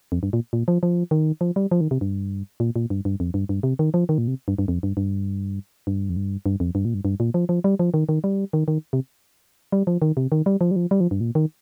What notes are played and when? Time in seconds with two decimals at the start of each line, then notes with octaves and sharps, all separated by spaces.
0.12 F2
0.23 G2
0.33 A#2
0.53 A#2
0.68 F3
0.83 F3
1.11 D#3
1.41 F3
1.56 G3
1.71 F3
1.81 D#3
1.91 C3
2.01 G2
2.60 A#2
2.76 A#2
2.90 G2
3.05 G2
3.20 F2
3.34 G2
3.49 G2
3.63 C3
3.79 D#3
3.94 F3
4.09 D#3
4.18 A#2
4.28 C3
4.48 G2
4.58 G2
4.68 F2
4.83 G2
4.97 G2
5.87 G2
6.09 F2
6.16 G2
6.46 G2
6.60 F2
6.75 G2
6.85 A#2
6.94 G2
7.05 G2
7.20 A#2
7.34 F3
7.49 F3
7.64 G3
7.79 F3
7.94 D#3
8.09 D#3
8.24 G3
8.53 D#3
8.68 D#3
8.93 C3
9.72 G3
9.87 F3
10.02 D#3
10.17 C3
10.32 D#3
10.46 G3
10.61 F3
10.71 G3
10.76 F3
10.91 G3
11.00 F3
11.11 G2
11.21 A#2
11.35 D#3